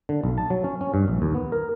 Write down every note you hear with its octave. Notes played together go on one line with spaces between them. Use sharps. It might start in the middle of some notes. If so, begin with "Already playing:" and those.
D3
B1
A5
F#3
C#4
C#4
G2
A#1
D#2
B3
A#4